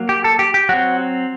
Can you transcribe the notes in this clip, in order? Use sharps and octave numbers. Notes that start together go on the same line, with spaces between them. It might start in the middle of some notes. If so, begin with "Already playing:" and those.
Already playing: F#3 A#3
G4
A4
G4
G4
F#3 C4 F#4